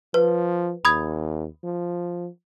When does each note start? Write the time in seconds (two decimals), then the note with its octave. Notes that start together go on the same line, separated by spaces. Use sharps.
0.14 F3 B4
0.85 D#2 B5 D#6 G#6
1.64 F3